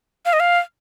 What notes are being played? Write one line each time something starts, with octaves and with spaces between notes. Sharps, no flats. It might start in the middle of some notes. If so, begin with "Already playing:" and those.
F5
D#5
F5